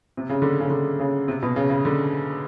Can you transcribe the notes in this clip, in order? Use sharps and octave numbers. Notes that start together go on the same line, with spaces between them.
C3
C#3
D3
C#3
D3
C#3
C3
B2
C#3
C#3
D3